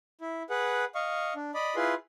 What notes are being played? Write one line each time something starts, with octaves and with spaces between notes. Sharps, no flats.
E4
G#4 B4 F#5
D#5 F5 C#6
D4
D5 D#5 B5
E4 F4 G#4 B4 C6